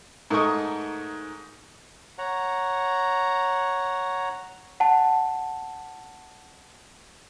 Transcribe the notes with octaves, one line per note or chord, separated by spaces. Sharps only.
G#2 A3 A#4 D#5 C#6 D#6
C#5 F#5 A#5
F#5 A5